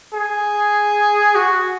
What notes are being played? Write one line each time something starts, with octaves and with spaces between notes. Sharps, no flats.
G#4
F#4